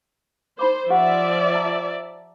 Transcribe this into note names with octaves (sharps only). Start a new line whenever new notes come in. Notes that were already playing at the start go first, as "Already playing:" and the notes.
D#4 C5 B5 D6
F3 G4 C5 D5 E5 F#5
A5 A#5